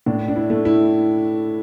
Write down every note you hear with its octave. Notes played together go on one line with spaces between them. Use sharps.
A2 D4
D4
E4
A3
E4